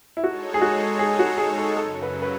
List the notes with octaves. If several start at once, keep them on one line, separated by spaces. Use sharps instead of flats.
E4
G#3 D#4 F#4 A4 C#5
G#4
F#4
G#4
F#4
G#4
A4
F#2 C#3 F#3 A4
B4
B4